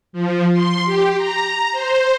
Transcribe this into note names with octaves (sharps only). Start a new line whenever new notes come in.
F3
C6
G4
A#5
C5